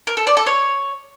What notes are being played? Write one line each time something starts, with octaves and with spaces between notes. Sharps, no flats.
A#4
A4
D5
A4
C#5